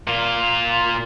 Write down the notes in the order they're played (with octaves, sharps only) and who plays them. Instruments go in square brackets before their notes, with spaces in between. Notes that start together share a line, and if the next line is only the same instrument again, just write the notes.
[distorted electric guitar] A#2 F4